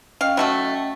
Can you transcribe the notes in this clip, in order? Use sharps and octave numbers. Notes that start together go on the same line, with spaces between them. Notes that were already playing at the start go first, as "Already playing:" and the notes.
C#4 D#5 F5 G5
F#3 A3 F#4